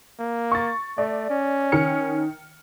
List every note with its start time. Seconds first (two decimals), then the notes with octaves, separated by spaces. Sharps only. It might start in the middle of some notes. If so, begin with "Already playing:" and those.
0.19 A#3
0.52 C#6 A6
0.98 A3 D5
1.30 C#4
1.72 D#3 F6 C#7